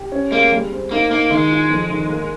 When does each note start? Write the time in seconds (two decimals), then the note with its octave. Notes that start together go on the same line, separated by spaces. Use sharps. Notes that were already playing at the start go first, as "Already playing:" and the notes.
Already playing: G4
0.12 C#4
0.31 G#3 A#3
0.52 G3
0.72 C4
0.91 A#3 D#4
1.11 A#3 D#4
1.30 D#3 G#3
1.51 F4
1.70 F2
1.90 D#3
2.09 A#3